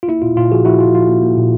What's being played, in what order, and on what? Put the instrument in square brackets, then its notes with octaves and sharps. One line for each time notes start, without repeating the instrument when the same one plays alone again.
[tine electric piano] F4
A#3 E4
A#2 F4
A#2 F4
F3 F#4 G#4
F3 E4 F#4
A#2 F4
F3 F4
A#3
A#3
A#2